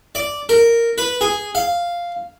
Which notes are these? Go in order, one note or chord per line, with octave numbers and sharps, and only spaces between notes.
D5
A#4
B4
G#4
F5